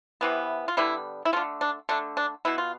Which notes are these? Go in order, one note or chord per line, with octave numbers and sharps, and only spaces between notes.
C3 E3 B3
F4
D3 G3 B3 E4
E4
D3 A3 F4
D4
D3 A3 D4
D4
B2 B3 E4
F4